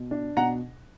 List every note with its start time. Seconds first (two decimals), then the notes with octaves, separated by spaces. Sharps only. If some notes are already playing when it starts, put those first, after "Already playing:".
Already playing: B2
0.11 D4
0.37 B2 F#5 A#5